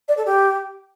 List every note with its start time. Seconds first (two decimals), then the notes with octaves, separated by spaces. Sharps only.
0.08 D5
0.17 A4
0.26 G4